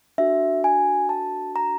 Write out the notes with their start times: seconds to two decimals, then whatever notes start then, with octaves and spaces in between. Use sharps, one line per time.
0.18 D4 F#4 A4 E5
0.64 G#5
1.09 A5
1.56 A#5